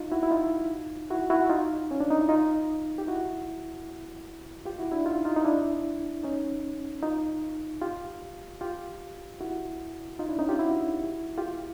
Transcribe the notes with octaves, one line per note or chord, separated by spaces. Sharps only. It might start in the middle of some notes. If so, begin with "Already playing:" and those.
Already playing: D#4 F4
E4 F#4
E4
D#4 F4
E4 F#4
E4 F#4
D#4 F4
C#4
D4
D#4
E4
D#4 F4
G4
E4 F#4
F4 G4
E4 F#4
D4 E4
D#4 F4
D#4 F4
D#4
D4 E4
C#4 D#4
D#4 F4
F4 G4
F4 G4
E4 F#4
D#4 F4
D4 E4
C#4 D#4
F4 G4
E4 F#4
F4 G4